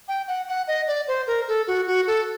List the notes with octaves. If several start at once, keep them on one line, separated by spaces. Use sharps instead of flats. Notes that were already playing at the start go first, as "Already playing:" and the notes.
G5
F#5
F#5
D#5
D5
C5
A#4
A4
F#4
F#4
A4